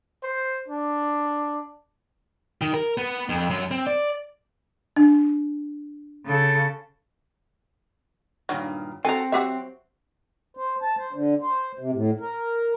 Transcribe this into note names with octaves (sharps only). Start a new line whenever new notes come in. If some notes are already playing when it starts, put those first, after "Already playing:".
C5
D4
D#3
A#4
B3
F2
F#2
C4
D5
D4
C#3 A4
G2 A#2 D#3 F#3
C4 F#4 A4 G#5 A#5
F#3 F#4 G4 E5
C5
A5
C5
D3
C5
C3
A2
A#4